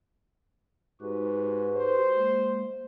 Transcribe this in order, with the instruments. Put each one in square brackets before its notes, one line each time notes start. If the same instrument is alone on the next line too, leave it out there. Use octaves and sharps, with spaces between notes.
[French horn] G#2 [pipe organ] F#4 G4 B4
[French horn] C5
[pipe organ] G#3 A#3